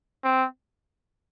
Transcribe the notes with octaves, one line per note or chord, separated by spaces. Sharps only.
C4